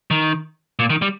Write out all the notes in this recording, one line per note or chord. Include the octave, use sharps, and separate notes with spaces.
D#3
A#2
D#3
G3